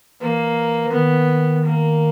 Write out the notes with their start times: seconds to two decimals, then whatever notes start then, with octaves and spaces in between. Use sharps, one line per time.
0.21 E3 A#3
0.92 D#3 B3
1.64 A#3